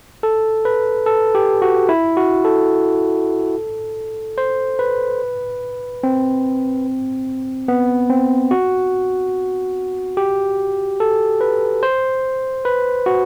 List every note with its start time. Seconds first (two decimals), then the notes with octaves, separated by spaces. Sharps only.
0.23 A4
0.65 B4
1.06 A4
1.35 G4
1.62 F#4
1.89 E4
2.17 F#4
2.45 A4
4.38 C5
4.79 B4
6.03 C4
7.68 B3
8.10 C4
8.51 F#4
10.17 G4
11.00 A4
11.41 B4
11.83 C5
12.65 B4
13.06 F#4